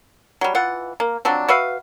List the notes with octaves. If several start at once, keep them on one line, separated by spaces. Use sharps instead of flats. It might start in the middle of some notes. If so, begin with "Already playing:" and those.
F#3 G3
E3 F4 F#5
A#3
F3 F#3 C4 D4
F#4 B4 E5 F5